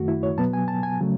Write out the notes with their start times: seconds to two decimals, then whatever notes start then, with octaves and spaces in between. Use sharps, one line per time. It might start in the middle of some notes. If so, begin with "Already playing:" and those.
Already playing: F#2 D#3 A3 F#4
0.08 E4
0.23 C#5
0.38 B2 F#3 B3 A5
0.53 G#5
0.68 A5
0.83 G#5
1.01 C#3 F#3 A3